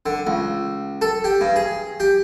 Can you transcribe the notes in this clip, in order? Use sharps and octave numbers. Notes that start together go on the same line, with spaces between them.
D3
C#2
A4
G4
G2
G#4
G4